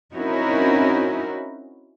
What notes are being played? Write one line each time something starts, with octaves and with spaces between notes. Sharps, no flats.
C4 C#4 D#4 E4 F#4 A#4